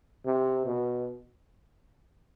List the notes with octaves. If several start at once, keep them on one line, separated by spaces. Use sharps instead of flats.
C3
B2